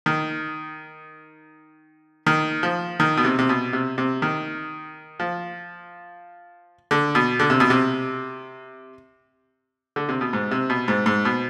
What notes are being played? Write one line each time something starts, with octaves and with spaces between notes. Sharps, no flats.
D#3
D#3
F3
D#3
B2
C3
C3
B2
C3
C3
D#3
F3
D3
B2
D3
C3
B2
C3
D3
C3
B2
G#2
C3
B2
G#2
G#2
B2